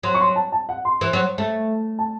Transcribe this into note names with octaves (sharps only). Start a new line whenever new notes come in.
F#3 C6
C#6
C6
A5
A5
F#5
C6
E3
F#3
A3
A5